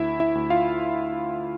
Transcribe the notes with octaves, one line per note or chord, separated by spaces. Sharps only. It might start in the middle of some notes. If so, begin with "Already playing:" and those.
Already playing: D2 E4 E5
E4 E5
D2
F4 F5